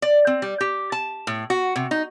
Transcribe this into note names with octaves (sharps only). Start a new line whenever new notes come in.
D5
C4
G3
G4
A5
A2
F#4
C3
D#4